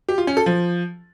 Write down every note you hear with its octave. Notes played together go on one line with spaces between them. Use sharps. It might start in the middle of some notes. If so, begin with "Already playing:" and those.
G4
F4
C#4
A4
F3